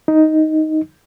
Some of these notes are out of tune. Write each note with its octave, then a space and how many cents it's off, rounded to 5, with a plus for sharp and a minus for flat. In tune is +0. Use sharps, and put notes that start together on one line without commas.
D#4 +5